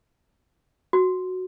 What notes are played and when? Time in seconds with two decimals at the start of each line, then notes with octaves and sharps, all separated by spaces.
0.93 F#4